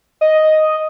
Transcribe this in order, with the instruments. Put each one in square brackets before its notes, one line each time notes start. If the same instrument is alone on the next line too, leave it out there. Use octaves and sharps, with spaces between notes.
[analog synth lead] D#5